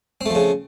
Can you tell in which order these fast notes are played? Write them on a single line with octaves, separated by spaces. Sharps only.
C4 A3 F3 C#3